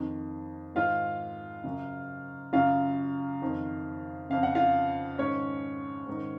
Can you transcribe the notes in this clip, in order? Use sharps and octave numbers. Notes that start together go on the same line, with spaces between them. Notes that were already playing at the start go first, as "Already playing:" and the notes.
Already playing: F2 D#3
G#2 D#3 F4 F5
F#2 C#3
F#2 C#3 F4 F5
F2 D#3
F2 C#3 F5
F#5
F4 F5
G#2 D#3 C#4 C#5
G#2 D#3